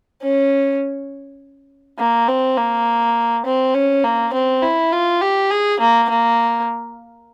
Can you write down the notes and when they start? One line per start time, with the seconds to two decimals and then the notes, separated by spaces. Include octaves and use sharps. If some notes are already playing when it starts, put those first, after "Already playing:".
0.22 C#4
1.99 A#3
2.28 C4
2.57 A#3
3.46 C4
3.75 C#4
4.04 A#3
4.33 C4
4.63 E4
4.92 F4
5.21 G4
5.51 G#4
5.80 A#3
6.10 A#3